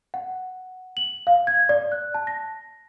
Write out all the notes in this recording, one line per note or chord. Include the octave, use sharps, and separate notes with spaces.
F#5
F#7
F5
G#6
D5
F#6
A5
A#6